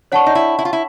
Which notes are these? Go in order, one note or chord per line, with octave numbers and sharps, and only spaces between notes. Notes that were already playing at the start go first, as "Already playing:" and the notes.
D4 C#5 F#5 A5 C#6
D#4
E4
E4
F4
E4